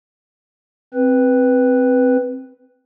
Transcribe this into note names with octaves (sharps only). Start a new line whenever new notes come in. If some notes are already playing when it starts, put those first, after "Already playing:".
C4 B4